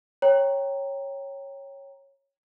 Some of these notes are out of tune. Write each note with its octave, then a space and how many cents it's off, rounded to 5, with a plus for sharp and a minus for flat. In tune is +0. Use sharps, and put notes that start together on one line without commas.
C#5 -10 G5 +0 A#5 +0